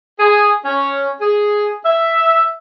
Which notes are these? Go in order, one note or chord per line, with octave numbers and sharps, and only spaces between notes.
G#4
C#4
G#4
E5